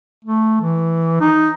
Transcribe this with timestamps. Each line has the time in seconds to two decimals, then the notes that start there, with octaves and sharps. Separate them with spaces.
0.24 A3
0.61 E3
1.21 D#4